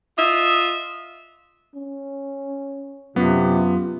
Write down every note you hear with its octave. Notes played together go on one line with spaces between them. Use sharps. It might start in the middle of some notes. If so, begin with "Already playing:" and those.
F4 D#5 E5
C#4
F#2 C3 B3 F4